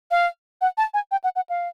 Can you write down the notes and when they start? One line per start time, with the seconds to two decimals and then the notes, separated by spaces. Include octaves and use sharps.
0.11 F5
0.61 F#5
0.77 A5
0.94 G#5
1.11 G5
1.24 F#5
1.36 F#5
1.49 F5